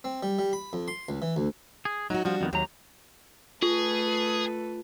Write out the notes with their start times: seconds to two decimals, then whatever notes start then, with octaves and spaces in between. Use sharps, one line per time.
0.04 C4
0.23 G3
0.39 G3
0.53 B5
0.73 F2
0.88 C6
1.09 C#2
1.22 E3
1.36 D2
1.85 G#4
2.10 F#3 D#4 F#4
2.25 F3 G3 D4 F#4
2.41 F2 D#3 B3
2.53 D#2 F#3 G4 A#5
3.62 A3 F4 G#4 A4 B4